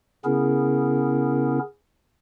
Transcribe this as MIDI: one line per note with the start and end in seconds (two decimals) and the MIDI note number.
0.25 1.59 49
0.25 1.59 59
0.25 1.59 61
0.25 1.59 64
0.25 1.59 68
0.25 1.59 70